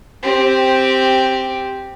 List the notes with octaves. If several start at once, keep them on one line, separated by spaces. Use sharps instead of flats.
C4 G4